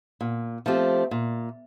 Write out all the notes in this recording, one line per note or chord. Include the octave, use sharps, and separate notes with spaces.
A#2
F3 A3 C4 G4
A#2